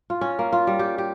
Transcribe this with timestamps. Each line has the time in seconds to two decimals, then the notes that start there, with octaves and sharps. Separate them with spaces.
0.10 F4
0.21 C#4
0.39 A#3
0.53 F4
0.67 G3
0.79 G4
0.98 G4